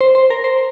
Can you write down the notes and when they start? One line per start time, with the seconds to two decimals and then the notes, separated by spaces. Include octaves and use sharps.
0.01 C5
0.15 C5
0.30 A#4
0.44 C5